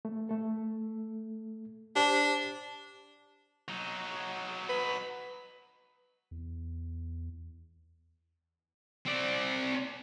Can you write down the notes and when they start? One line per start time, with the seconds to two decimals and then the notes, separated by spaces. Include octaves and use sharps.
0.05 A3
0.29 A3 A4
1.96 D4 G4 C5
3.68 F#3 D#4
4.69 B4
6.31 E2
9.06 C4 D5